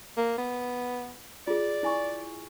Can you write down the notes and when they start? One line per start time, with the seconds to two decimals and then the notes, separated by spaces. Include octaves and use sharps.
0.17 A#3
0.38 B3
1.47 F4 G#4 D5
1.83 E4 G#5 C#6